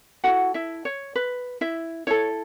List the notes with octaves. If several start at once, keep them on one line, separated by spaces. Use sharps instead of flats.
E4 F#4 A4 F#5
E4 E5
C#5
B4
E4 E5
E4 A4 C#5